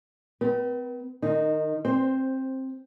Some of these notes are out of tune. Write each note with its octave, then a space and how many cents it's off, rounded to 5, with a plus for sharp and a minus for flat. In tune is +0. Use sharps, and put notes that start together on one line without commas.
C4 -45 B4 -35
D#3 -25 D#4 +0
C4 +15 C5 +0